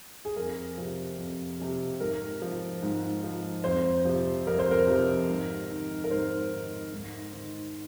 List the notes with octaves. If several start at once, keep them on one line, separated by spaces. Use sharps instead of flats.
G#4
F2 A#4
C3 F3
F2
C3 F3
G#2 A#4
F3
G#2
F3
F2 C5
C3 F3
F2 A#4
C5
A#4
C3 F3
G#2
D#3
A#4
G#2 C5
D#3
G#2
D#3